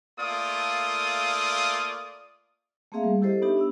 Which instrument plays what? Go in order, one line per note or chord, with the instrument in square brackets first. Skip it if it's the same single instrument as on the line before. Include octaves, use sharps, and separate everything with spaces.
[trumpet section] A3 A#3 F4 D5 D#6
[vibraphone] A3 A#3 C4 G#4 E5 F5
G3
E4 G4 A4 C5 D#5
B3 D4 D#4 G4 E5
B3 D4 D#4 E6